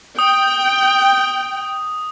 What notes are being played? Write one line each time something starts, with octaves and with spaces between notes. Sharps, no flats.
G5 D#6